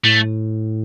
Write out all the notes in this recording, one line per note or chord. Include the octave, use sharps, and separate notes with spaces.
A2 A3